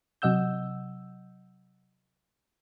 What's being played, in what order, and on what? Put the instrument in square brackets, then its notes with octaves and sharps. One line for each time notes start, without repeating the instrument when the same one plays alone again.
[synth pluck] C3 F#3 D#5 F#5 E6 G6